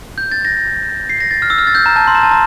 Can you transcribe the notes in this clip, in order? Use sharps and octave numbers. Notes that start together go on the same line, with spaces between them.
G6
A6
A#6
C7
A#6
A6
F6
E6
F6
A6
G6
A#5
A5
C6
A#5
A5
A#5